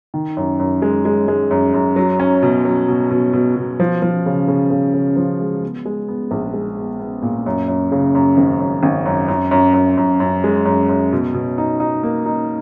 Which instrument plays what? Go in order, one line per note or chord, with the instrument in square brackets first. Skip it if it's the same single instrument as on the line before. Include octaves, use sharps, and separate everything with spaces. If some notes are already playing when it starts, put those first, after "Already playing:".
[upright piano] D#3
F#2
F#2
G#3
G#3
G#3
F#2
F#2
F#3
C#4
B2
F#3
B2
B2
B2
B2
F3
F3
C#3
C#3
C#3
C#3
F3
G#3
B3
G#3
B3
A#1
G#3
B3
B3
A#2
F#2
F#2
C#3
F#2
G#1
F#2
G#1
F#2
F#2
F#2
F#2
F#2
F#2
G#3
F#2
F#2
B2
B2
D#4
D#4
A#3
D#4